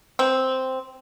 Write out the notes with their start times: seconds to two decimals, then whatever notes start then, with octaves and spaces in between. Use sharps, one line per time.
0.19 C4